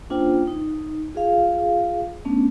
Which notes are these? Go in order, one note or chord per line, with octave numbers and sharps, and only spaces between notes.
A#3 C#4 D4 F4 C5 G5
D#4
F4 G#4 F5
A3 B3 C#4 D4